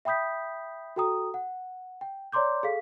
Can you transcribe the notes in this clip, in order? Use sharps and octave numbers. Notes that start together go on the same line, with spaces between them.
E5 G5 B5 D#6 G6 B6
F#4 A4 G5 A#5 D#6
F#5
G5
C#5 D5 A#5 C6 D6 G6
G#4 A4 F5 B6